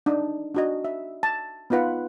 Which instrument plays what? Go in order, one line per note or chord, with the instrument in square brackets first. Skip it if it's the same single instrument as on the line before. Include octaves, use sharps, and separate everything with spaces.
[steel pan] D4 D#4
D4 F#4 D#5
E5
A5
B3 D#4 F4 B4 F#5